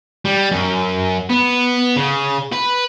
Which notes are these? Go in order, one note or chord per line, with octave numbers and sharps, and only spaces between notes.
G3
F#2
B3
C#3
B4